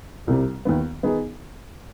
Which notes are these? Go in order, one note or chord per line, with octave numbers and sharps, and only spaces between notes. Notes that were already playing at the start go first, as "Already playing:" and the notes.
C2 C3 G3
D#2 D#3 B3
D#3 B3 D#4 G#4